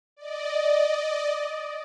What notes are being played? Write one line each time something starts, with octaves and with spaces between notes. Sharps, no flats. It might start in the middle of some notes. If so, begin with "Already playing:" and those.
D5 D#5